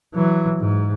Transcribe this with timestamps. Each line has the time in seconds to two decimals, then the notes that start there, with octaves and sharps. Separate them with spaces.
0.15 E3 F#3
0.60 G#2